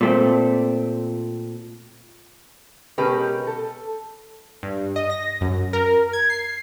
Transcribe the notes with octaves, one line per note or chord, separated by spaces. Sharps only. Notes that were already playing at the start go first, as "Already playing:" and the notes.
A#2 A3 C4
B2 G#3 C#4 G4 A#4 B4
A4
G2
D#5
A#6
F#2
A#4
G#6
C7